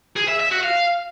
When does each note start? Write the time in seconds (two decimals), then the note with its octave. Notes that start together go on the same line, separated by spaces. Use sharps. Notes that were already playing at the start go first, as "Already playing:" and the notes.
0.17 G#4
0.28 E5
0.40 E5
0.52 F#4
0.64 F5